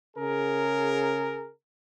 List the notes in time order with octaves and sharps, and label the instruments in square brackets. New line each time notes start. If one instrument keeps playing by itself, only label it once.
[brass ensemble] C#3 G#4 A#4